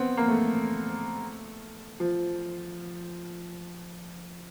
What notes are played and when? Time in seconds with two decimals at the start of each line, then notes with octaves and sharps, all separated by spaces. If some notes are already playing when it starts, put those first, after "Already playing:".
Already playing: B3 C4
0.17 A#3
0.28 A3
2.00 F3